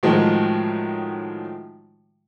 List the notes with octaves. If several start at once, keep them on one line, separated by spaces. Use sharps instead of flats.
A2 D#3 F3 F#3 G#3